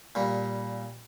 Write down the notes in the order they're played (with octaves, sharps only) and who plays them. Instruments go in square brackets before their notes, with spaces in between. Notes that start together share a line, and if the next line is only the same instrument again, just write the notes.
[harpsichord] A#2 G3